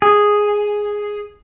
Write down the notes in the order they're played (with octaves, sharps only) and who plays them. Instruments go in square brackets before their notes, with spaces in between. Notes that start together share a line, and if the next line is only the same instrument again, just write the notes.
[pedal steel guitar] G#4